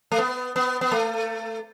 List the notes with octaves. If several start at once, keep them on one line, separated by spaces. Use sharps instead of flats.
A3
B3
B3
B3
A3